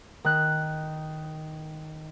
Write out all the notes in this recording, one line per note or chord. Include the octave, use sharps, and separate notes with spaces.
D#3 F#6